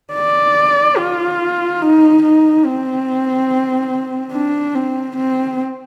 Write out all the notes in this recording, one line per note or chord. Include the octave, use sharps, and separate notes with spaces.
D5
F4
D#4
D#4
C4
D4
C4
C4